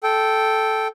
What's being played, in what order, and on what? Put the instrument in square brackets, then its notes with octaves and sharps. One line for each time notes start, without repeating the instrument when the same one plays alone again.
[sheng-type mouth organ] A4 G5